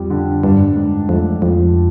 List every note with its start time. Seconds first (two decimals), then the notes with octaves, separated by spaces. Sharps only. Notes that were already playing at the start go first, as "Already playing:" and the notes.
Already playing: F2 G3
0.10 D3
0.44 G2 D4
0.76 G#2
1.09 F2 A3
1.42 F2 F3